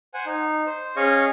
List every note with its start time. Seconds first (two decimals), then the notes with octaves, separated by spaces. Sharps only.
0.14 C5 F#5 G#5
0.26 D#4
0.66 C5
0.96 C#4 G#4 C#5 D#5 F5 C#6